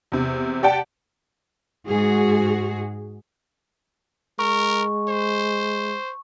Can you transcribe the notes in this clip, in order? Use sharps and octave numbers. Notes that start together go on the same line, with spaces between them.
E2 C3
G4 D5 F#5 G5 A5
G#2 F#4 G#4
G#3 A#4 C#6
C5